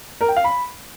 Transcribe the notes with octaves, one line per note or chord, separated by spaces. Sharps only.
A#4
G5
F5
B5